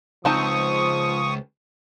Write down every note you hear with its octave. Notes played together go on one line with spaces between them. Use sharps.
C#2 F3 C4 D#4 A5 C#6 D#6